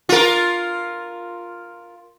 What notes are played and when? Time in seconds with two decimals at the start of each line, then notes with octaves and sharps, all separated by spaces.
0.09 F4 A#4